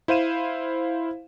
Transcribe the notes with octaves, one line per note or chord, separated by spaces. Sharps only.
E4 C5 F5 D#7 E7